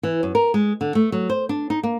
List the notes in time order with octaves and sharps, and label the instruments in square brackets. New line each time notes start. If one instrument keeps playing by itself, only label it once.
[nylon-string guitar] E3
F#2
A#4
G#3
D3
A3
F#3
C5
D4
D#4
A#3